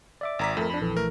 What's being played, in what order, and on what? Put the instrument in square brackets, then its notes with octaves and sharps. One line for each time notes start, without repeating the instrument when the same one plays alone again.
[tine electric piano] D5 E5 D6
[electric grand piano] G#1 A#5 B6
[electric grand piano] F2 [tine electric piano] A3 A#4
[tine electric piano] D4 B5
A#1 E3 A4
[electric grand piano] A3 A#4